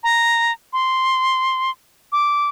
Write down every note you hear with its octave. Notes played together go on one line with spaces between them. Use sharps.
A#5
C6
D6